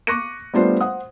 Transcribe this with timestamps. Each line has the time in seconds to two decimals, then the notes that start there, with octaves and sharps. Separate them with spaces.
0.07 C#6 D6 F#6 A#6 C#7 D#7
0.54 G3 A3 B3 D4 F4 C5
0.81 C5 F#5 D#6